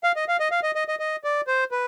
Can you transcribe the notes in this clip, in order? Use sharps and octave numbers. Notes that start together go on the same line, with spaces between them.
F5
D#5
F5
D#5
F5
D#5
D#5
D#5
D#5
D5
C5
B4